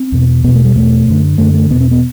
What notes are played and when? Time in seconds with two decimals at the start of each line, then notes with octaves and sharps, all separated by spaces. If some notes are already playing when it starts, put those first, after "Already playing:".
Already playing: C4
0.12 E2 B2
0.44 B2 B3
0.47 E2
0.55 A3
0.65 G3
0.76 E2 B2 A3
1.07 F#2 D3
1.38 F#2 D3 A3
1.54 A3
1.71 E2 B2 B3
1.81 C4
1.91 B3